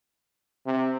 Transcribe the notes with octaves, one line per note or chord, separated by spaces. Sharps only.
C3